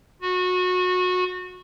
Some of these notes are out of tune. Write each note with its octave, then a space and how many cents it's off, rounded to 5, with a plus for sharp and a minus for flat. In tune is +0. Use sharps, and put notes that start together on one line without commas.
F#4 -25